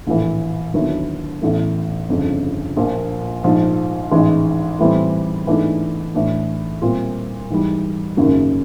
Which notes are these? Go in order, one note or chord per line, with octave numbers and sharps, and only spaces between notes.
A#1 A2 E3
D#2 D3 F#3 B3 E4
A1 A2 E3 A3
G1 F2 C#3
A#1 A#2 F3 A#3
A#1 G#2 F3
A1 G#2 E3 G#3
A2 E3 G3 C4
G#2 E3 A3 D4
A2 E3 A3 D4
A#2 G3 C4 F4
G#2 E3 G3
G#1 F#2 C#3 F#3 A#3